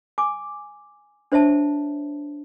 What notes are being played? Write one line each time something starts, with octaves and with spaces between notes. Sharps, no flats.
G#5 D6
D4 C5 C#5 E5 A5